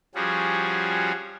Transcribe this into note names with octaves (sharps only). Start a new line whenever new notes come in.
F3 G3 C#4 F#4 G#4